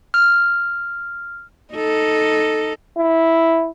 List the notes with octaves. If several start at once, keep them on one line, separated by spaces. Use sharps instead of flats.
F6
D#4 A4
E4